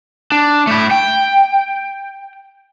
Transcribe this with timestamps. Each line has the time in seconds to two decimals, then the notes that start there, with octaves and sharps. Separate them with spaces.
0.32 D4
0.67 A3 E4
0.91 G5